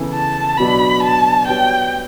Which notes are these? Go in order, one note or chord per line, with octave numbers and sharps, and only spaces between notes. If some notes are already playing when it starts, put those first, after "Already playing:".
Already playing: C#3 E3 B3 E4 A4
A5
B2 F#3 B3 D4 F#4 B5
A5
G3 B3 F#4 C#5 G5